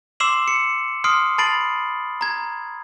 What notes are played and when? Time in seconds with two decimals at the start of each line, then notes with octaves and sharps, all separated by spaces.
0.20 C6 D6 E6 C7 E7 F#7
0.48 C#7
1.04 C6 D#6 F6 C7 D7
1.38 A5 B5 A6 C7 D7 F#7
2.21 A#5 G#6